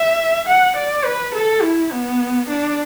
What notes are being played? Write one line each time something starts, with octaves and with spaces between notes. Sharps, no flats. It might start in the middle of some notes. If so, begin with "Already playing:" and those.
Already playing: E5
F#5
D5
B4
A4
E4
B3
D4